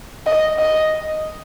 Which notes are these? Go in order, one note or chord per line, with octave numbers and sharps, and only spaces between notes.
D#5
D#5